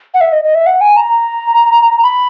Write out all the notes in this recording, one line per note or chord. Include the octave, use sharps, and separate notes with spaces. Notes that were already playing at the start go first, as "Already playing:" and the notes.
F#5
E5
D#5
D#5
E5
F#5
G#5
A#5
B5